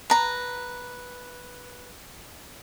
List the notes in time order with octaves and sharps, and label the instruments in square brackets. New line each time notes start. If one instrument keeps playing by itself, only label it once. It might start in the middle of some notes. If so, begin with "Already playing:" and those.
[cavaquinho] B4 A#5